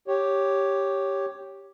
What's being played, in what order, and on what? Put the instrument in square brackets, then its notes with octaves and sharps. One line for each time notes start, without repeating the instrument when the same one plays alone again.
[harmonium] G4 C#5